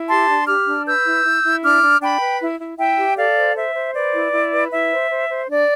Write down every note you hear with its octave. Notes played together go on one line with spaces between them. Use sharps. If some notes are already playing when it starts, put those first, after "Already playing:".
Already playing: E4
G4 A5 C6
D4
G4 D6 F6
D4
B4 E6 G6
E4
E4
E4
D4 D6 F6
D4
D4 G5 B5
B4
E4
E4
E4 E5 G5
G4
A4 D5 F5
C5
C5 E5
C5
B4 D5
E4
E4
B4
E4 E5
C5
C5
C5
D4 D5